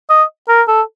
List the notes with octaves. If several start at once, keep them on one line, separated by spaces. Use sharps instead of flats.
D#5
A#4
A4